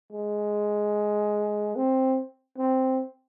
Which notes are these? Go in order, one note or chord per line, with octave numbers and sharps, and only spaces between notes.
G#3
C4
C4